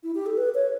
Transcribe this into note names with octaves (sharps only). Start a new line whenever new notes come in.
E4
G4
A4
B4
C#5